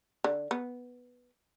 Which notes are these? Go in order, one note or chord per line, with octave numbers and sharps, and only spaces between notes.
D3
B3